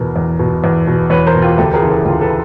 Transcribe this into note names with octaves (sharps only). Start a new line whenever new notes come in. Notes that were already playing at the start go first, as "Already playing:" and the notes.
Already playing: E2 B2 A#4
E2
B2
E2
B2
E2 B4 C#5
A#4 C5
B2
F4 G4
D2 G4 A4
G#4 A#4
C#3 E3
G4 A4
D2 F4 G4
A4 B4